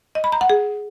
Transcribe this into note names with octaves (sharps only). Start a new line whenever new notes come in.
D#5
B5
A#5
F#5
G#4